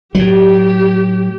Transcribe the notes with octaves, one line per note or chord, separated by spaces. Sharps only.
A2 F#3 G4